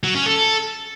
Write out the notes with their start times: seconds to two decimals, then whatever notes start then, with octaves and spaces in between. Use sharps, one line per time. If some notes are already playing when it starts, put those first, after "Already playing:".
0.03 F#3
0.15 C#4
0.26 A4